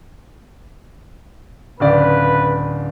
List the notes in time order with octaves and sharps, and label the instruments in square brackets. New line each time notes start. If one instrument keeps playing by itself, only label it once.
[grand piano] D1 C#3 D5 [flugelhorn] B4